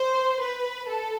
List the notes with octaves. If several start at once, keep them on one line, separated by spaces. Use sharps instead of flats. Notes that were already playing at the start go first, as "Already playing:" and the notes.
Already playing: C5
B4
A4